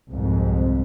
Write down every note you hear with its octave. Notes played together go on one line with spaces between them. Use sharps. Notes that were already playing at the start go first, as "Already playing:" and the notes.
C2 F2 G#2